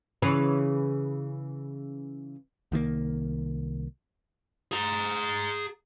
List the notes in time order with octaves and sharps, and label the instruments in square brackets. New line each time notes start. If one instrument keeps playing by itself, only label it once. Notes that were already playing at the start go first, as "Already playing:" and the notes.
[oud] C#3 E3 B4
[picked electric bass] C2 D#3 G3 A#3
[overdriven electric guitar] G#4 A#5